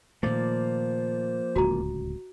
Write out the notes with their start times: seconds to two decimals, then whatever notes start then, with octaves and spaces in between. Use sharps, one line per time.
0.23 A#2 D#3 F3 A3 A#3 C5 D5
1.56 D1 C#2 F#4 A#5